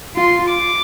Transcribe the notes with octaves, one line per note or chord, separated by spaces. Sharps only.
F4 C6
D6